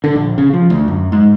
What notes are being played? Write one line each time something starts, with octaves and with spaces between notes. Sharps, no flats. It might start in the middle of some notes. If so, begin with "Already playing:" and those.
D3
A#1
C#3
F3
D2
F#2
G#2